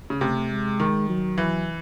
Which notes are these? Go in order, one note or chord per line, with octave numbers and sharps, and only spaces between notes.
C#3
C3 A3
G#3
D#3
F#3
E3